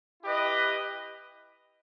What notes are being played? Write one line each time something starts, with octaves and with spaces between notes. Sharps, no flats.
E4 G4 B4 D#5